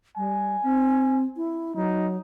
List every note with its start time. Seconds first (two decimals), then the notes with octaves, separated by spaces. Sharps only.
0.17 G3 G#5
0.63 C4
1.37 E4
1.76 F#3 D#4